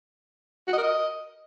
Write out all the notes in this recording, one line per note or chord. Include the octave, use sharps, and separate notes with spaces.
F#4
D#5
A#4
D#5